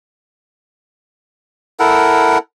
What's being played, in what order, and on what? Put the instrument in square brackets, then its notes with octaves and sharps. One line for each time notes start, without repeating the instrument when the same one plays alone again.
[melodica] E4 A4 A#4 F#5